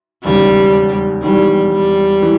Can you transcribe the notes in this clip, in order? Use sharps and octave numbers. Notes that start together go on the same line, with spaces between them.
E1 D#2 C#3 G3
E1 E2 D#3 G3
G3
E3